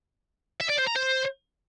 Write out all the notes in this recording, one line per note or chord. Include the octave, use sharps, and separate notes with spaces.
E5
D5
C5
A#5
C5